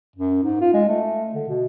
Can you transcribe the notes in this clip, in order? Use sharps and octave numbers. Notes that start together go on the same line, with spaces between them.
F#2
G#2
F4
G#3
A3
D3
B2